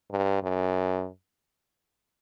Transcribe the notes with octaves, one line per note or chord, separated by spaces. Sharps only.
G2
F#2